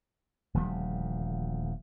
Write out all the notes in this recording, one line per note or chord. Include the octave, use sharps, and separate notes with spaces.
D#1 D2 F3 G3